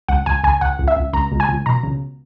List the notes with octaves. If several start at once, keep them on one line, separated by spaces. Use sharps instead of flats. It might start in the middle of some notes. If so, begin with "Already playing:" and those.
C#2 F#5
C#2 G#5
C#2 G#5
C#2 F#5
C#2
E5
C#2
C#2 A#5
C#2
G#5
C#2
B2 A#5
C#2